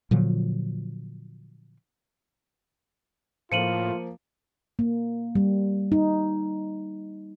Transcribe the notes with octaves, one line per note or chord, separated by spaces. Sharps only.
A#2 D3 F3 F#3
A2 F3 A#3 F4 C#7 D#7 F#7
A#3
G3
D#4